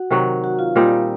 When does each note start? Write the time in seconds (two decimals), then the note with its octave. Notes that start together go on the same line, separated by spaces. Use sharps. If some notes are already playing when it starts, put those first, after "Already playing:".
Already playing: F#4 F#5
0.11 C3 D#3 F#3
0.44 F#4 F#5
0.59 F4 F5
0.76 A#2 G3 C4 D#4